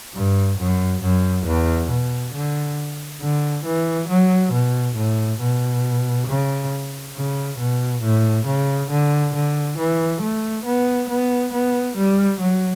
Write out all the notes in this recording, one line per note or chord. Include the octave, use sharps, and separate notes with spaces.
G2
F#2
F#2
E2
B2
D3
D3
E3
F#3
B2
A2
B2
C#3
C#3
B2
A2
C#3
D3
D3
E3
A3
B3
B3
B3
G3
F#3